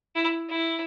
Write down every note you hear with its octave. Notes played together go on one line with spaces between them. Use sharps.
E4
E4